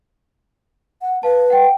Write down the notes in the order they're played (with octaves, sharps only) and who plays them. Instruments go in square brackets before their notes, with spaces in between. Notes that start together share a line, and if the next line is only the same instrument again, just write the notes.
[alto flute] F#5
[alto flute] B4 [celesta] F5 A5
[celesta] F#5 G5